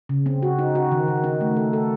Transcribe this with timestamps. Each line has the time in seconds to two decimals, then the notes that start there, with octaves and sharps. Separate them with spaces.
0.09 C#3
0.26 C4
0.43 F#4
0.59 D#4
0.75 F#4
0.92 D#3
1.08 D#3
1.24 D#4
1.41 A3
1.57 A4
1.73 A4